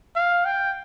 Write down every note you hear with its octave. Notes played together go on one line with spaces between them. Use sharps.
F5
G5